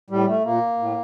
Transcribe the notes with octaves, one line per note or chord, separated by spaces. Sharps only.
A2 G3
A3
A#2 A#3
A2